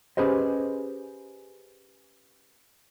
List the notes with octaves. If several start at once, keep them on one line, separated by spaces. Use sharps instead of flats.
C#4 G4 G#4 B4 C5 D#5